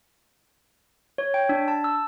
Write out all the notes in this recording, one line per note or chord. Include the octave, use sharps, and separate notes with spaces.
C#5
G5
D4
A5
E6